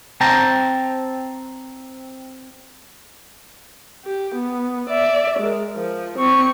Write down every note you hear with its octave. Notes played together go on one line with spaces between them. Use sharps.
C4 G5 A5 A#5
G4
B3
D5 E5
G#3 A#4
F3
C4 C#6